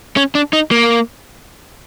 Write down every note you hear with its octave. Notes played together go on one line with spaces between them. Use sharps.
C#4
D4
D#4
A#3